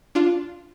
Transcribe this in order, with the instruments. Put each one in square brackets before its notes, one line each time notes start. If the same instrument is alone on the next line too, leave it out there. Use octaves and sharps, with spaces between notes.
[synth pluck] D4 F4